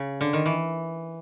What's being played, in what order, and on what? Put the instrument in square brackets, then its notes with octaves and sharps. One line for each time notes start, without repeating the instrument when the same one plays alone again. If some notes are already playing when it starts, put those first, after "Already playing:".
Already playing: [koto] C#3
D3
D#3
E3